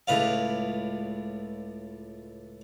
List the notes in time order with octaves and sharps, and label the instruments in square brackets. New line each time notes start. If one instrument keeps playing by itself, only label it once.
[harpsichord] C#2 A2 B4 F5